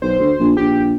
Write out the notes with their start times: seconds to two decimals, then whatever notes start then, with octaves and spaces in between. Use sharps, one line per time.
0.02 B1 C5
0.20 D2
0.39 A#1
0.57 A#1 G4